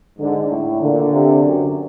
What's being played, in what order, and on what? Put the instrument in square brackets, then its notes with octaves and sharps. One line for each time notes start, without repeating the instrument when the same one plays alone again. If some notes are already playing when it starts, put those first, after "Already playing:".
[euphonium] G#2 [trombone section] D3
[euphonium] A2
[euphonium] A#2 [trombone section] D3
[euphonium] C3
F#2